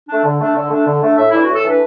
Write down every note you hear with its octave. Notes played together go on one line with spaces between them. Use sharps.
A3 D4
D3
A3 D4
D3
A3 D4
D3
A3 D4
A2 E5
E3 A3 D4 E4
F#4
A2
A4
E3 A3 D4 B4